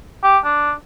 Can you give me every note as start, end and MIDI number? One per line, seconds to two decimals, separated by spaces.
0.23 0.38 67
0.45 0.72 62